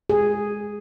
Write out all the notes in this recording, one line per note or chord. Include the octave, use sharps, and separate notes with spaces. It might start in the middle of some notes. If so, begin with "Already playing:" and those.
G#4